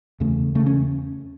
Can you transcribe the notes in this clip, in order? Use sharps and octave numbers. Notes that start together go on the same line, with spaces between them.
E2 C#3 A3
E2 C#3 A3
C#4